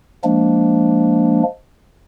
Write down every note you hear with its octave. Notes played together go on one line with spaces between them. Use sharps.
F3 G#3 A#3 D4